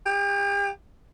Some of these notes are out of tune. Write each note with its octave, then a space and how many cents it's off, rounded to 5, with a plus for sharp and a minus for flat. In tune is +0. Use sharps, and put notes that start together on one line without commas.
G4 +40